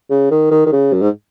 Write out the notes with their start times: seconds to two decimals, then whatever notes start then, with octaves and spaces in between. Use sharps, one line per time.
0.10 C#3
0.31 D#3
0.51 D#3
0.66 D#3
0.72 C#3
0.93 F#2
1.01 G#2